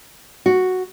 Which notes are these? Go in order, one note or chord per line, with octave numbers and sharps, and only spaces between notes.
F#4